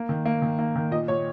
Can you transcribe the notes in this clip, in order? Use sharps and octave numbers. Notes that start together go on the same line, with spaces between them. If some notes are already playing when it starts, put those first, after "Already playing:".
Already playing: A#3
D#3
A#3
D#3
A#3
D#3
A#2 D#5
A#2 C#5